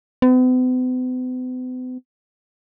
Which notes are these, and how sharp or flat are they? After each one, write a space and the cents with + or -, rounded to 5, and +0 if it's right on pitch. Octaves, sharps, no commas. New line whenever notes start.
B3 +45